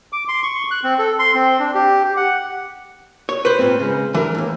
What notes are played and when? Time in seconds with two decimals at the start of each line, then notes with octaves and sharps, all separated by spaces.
0.12 D6
0.28 C6
0.43 C#6
0.71 F#6
0.84 C4
0.99 A4
1.19 C6
1.34 C4
1.59 D4
1.74 G4
2.04 G4
2.17 F#5
3.29 C#5
3.45 B4 C5
3.59 A#2 C4
3.80 C#3 G#3
4.14 E3 D4 A#4
4.35 D#2 G#2